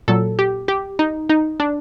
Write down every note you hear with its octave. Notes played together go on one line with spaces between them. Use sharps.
A#2 F#3 A4
G4
G4
D#4
D#4
D4